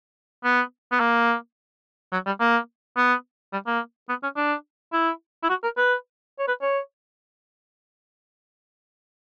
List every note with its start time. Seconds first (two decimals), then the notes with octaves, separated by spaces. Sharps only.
0.44 B3
0.92 B3
1.00 A#3
2.12 F#3
2.26 G3
2.40 A#3
2.96 B3
3.53 G3
3.67 A#3
4.09 B3
4.23 C#4
4.36 D4
4.93 E4
5.43 E4
5.49 F#4
5.63 A#4
5.77 B4
6.39 C#5
6.48 B4
6.62 C#5